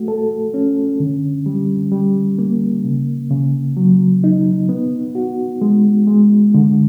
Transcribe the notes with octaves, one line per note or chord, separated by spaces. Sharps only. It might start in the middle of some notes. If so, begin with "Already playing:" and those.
Already playing: A3 F#4
A4
C#4
D3
G3
G3
A#3
C#3
C#3
F#3
D#4
B3
F#4
G#3
G#3
D3